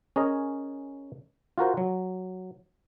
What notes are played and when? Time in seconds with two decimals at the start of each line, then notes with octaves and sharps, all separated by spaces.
0.16 C#4 G#4 A#4 C#5 D#5
1.58 F4 F#4 A#4 C5
1.77 F#3